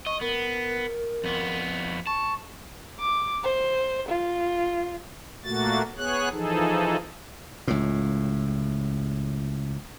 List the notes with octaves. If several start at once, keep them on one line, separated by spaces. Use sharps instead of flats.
D#5 C#6
B3 A#4
F2 B3
A5 C#6
D6
C5
F4
A#2 A3 A#3 F#4 A6
B3 G#4 C#5 F#6
E3 F3 D#4 G#4 A4
C#2 A2